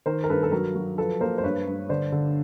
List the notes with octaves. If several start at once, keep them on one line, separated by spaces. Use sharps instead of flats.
D#3 A#4 C5
A#4
G2 A4 B4
A4
F#3 A#4
F#3
F3 A4 B4
A#3 A#4 C5
C5
G2 B4 C#5
G2
D3 C5 D5
D3